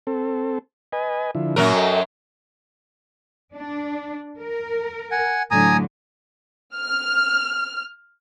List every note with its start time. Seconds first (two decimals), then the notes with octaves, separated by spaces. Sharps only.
0.07 C4 A4
0.93 B4 D#5 G#5
1.35 D3 F3 E4
1.56 F#2 A#2 F#3 A#4 A#5
1.76 A4 D#5 G5
3.54 D4
4.39 A#4
5.11 F#5 G#5
5.51 A2 D3 F#3 G#5 A#5 D#6
6.74 F6